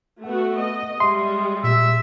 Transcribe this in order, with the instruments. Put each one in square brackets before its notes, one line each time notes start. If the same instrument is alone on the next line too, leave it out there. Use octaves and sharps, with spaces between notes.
[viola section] A3 B3 F#4 [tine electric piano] F#5
[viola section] D#5
[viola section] G3 G#3 [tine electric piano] E5 [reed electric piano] C6
[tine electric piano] A#2 [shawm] E5